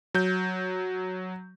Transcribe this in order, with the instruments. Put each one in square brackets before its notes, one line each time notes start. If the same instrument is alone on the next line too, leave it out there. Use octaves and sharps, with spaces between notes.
[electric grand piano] F#3 G6